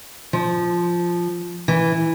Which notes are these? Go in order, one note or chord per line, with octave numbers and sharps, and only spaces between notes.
F3
E3